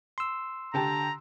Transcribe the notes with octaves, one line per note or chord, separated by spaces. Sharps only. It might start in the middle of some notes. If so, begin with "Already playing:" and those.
C6 E6
D3 G4 A5 A#5